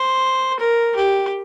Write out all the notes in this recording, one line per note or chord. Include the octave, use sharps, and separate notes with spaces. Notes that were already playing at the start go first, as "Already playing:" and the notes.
Already playing: C5
A#4
G4